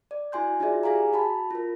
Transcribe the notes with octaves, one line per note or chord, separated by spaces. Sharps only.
D5
E4 F#4 G#5 C6 G6
D#4 F4 F#4 G#4 D5 E5
G4 G#4 F5 G#5 A#5
F#4 A5 B5
F4 A#4